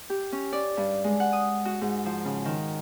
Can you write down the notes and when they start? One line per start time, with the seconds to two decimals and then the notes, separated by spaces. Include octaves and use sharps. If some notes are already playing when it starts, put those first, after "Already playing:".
0.10 G4
0.32 C#4
0.53 D5
0.77 G2
1.04 G#3
1.20 F#5
1.33 D#6
1.65 F#4
1.81 G#2
2.06 F3
2.25 C#3
2.45 D#3